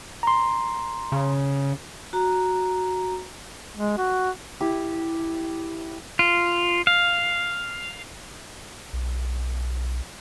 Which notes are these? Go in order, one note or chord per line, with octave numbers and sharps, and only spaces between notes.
A#5 C6
C#3
F#4 A#5
G#3
F#4
E4 G4 D#6
F4
F5
B1